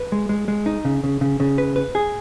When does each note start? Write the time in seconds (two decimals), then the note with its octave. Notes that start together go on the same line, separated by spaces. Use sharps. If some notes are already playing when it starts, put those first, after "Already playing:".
Already playing: B4
0.12 G#3
0.29 G#3
0.48 G#3
0.66 D#4
0.85 C#3
1.04 C#3
1.21 C#3
1.40 C#3
1.58 B4
1.76 B4
1.95 G#4